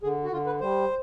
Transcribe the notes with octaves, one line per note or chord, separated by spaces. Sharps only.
D3 G#4
F#4
D3 F4
B4
G3 C5